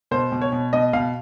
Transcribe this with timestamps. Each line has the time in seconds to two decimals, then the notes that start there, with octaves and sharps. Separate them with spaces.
0.11 B2 C5
0.32 B2
0.41 C#5
0.52 B2
0.73 B2 D#5
0.93 B2 F5